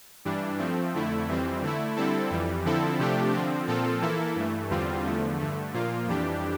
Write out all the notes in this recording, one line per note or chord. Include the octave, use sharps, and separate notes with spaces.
G2 E3 G3 D4
F3 A3 C4
F2 D3 A3 E4
F2 E3 G3 C4
D3 A3 E4
D3 G3 C4 E4 A4
F2 E3 G3
D3 F3 C4 E4 A4
C3 F3 A3 D4 G4
D3 F3 C4
A#2 F3 C4 F4 A4
E3 A#3 E4 A4
G2 E3 A3
E2 D3 G3 C4 F4
E2 D3 F3 A3
G2 D3 A3
A#2 F3 A#3 F4
F2 E3 G3 D4 G4